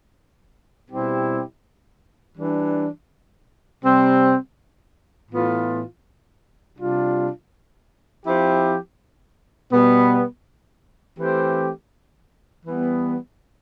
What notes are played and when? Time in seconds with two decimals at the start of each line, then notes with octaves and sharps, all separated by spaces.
0.91 B2 G3 C4 E4 G4
2.38 E3 G3 D4
3.85 C3 G3 C4
5.31 A2 E3 B3 F4
6.78 C3 G3 D4 F4
8.26 F3 C4 E4 G4
9.73 B2 G3 B3
11.19 E3 A3 C4 G4
12.66 E3 G3 B3